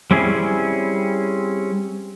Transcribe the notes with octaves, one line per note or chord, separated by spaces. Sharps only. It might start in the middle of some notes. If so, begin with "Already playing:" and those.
G3 C4 C#4 E4 G#4